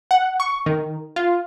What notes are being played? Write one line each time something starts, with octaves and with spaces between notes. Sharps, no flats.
F#5
C#6
D#3
F4